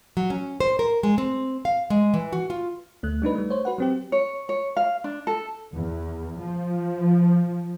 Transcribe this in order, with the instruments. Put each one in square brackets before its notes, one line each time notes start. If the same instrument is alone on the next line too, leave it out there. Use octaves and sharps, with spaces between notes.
[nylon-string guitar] F#3
C#4
C5
A#4
G#3
C4
F5
G#3
E3
F#4
F4
[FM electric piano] D2 A3 F#6
G3 D4 D#4 B4
G3 A3
C5 C#5
F#4 B4 F#5
F#3 C4 G4
[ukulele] C#5
C#5
F5
D4
A4
[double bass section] E2
F3